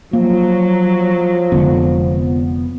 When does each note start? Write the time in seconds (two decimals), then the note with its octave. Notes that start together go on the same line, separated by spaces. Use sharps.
0.13 F3 F#3 A#3
1.52 F1 D3 G#3 B3